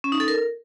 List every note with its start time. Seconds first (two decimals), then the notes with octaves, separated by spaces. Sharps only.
0.04 C#4
0.12 D#4
0.20 A4
0.28 A#4